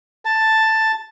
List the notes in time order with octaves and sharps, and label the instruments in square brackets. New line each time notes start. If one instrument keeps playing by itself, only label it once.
[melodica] A5